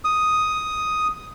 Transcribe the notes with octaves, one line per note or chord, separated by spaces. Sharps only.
D#6